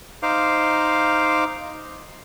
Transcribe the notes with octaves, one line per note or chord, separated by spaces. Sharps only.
D#4 C5 F5 D6